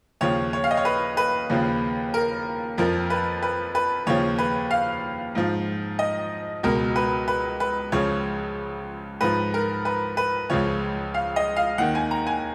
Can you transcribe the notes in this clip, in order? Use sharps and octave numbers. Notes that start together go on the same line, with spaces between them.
D#2 C#3 F3 C#5
C#5
F5
D#5
C#5
B4
B4
D#2 C#3 F3
A#4
F2 F3 A#4
B4
B4
B4
D#2 C#3 F3 C#5
B4
F5
G#2 F3
D#5
C#2 B2 A#4
B4
B4
B4
C#2 C#3 F3 C#5
G#2 F3 B4
A#4
B4
B4
C#2 C#3 F3 C#5
F5
D#5
F5
D#2 D#3 F#5
G#5
A#5
G#5